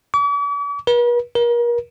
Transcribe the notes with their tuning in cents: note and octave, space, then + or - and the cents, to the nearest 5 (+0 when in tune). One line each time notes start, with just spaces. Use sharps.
D6 -45
B4 -45
A#4 +35